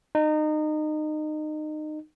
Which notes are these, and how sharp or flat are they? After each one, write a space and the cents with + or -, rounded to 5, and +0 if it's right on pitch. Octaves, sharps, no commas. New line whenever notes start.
D#4 -25